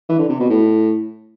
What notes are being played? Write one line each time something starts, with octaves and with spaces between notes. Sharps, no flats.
E3
D3
C3
B2
A2